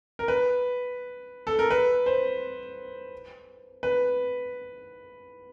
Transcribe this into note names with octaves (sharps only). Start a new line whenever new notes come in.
A#4
B4
A4
A#4
B4
C5
B4